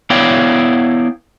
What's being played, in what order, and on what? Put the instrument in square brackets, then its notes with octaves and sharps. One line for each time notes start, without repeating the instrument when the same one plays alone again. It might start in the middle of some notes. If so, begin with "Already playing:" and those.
[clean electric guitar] B3 E4 C#5 D5 F5 G5